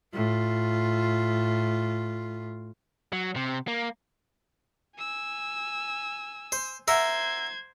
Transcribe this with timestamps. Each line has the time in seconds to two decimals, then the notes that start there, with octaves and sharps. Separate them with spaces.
0.14 A2 F4
3.13 F#3
3.36 C3
3.68 A#3
4.98 G#5 E6
6.52 C5
6.88 A#4 C5 E5 F#5 G#6